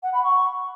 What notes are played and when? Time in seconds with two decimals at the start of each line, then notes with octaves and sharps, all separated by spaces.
0.03 F#5
0.13 B5
0.23 C#6